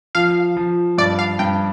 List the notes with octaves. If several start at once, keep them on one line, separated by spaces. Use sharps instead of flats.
F3 F5
F3
G2 D5
F5
G2 G5